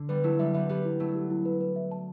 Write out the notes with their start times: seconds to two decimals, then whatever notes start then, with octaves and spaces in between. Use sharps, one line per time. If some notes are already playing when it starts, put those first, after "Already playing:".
Already playing: D3
0.09 G3 B3 B4
0.24 F#3 A3 E4
0.39 G3 B3 E5
0.54 G3 B3 E5
0.69 G3 B3 G4
0.85 E4
1.00 F#3 A3 E4
1.15 G4
1.30 E4
1.45 B4
1.61 B4
1.76 E5
1.91 A5